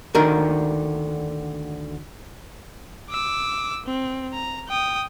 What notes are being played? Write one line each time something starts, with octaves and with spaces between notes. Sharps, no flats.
D2 D3 D#3 A#4
D6 E6
C4
A#5
G5 D#6